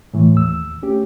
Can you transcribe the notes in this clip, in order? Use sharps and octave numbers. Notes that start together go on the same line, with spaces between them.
A2 E3 A3
D#2 E6
A3 C#4 G4